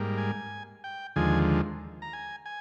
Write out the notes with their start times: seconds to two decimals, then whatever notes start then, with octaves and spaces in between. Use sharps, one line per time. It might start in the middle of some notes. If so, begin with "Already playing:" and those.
Already playing: G#2 G3 A#3
0.18 G#5
0.84 G5
1.16 D#2 D3 F3 G#3 G#5
2.02 A#5
2.13 G#5
2.46 G#5